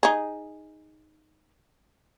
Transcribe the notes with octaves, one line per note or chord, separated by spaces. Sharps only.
D#4 G#4